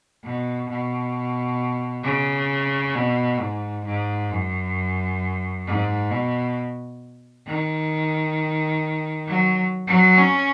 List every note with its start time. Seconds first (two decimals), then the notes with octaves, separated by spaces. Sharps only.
0.24 B2
0.70 B2
2.04 C#3
2.95 B2
3.39 G#2
3.85 G#2
4.30 F#2
5.66 G#2
6.11 B2
7.47 D#3
9.27 F#3
9.87 F#3
10.18 C#4